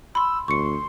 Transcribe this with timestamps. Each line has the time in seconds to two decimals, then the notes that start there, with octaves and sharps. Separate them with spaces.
0.15 B5 C6 E6
0.48 D2 C6 C#6 C#7